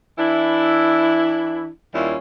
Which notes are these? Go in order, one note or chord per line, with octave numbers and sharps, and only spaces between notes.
E3 D4 E4
D#2 G3 C#4 E4 F4